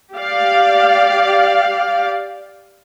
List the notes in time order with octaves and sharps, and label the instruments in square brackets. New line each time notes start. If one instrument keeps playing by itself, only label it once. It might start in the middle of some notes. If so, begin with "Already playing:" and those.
[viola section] G4 D5 F5